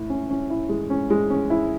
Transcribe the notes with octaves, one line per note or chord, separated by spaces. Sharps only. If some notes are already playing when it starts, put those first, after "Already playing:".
Already playing: A2 E4
C#4
C#4
E4
G#3
C#4
G#3
C#4
E4